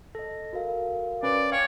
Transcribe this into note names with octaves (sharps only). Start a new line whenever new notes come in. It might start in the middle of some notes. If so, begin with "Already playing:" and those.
A4 D#5 A#6
F#4 A#4 F5
C#4 B4 D5
C#5 F5 G5 G#5 C#6